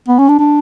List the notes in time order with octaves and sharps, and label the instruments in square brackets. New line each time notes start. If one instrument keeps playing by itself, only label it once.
[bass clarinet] B3
C#4
D4
D4